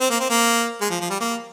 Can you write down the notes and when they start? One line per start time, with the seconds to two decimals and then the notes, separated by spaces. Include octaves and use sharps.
0.01 C4
0.10 A#3
0.20 C4
0.30 A#3
0.81 G#3
0.90 F3
1.01 F3
1.10 G3
1.21 A#3